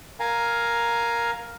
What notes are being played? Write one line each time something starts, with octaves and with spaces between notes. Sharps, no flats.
A#4 F5 G#5 A#5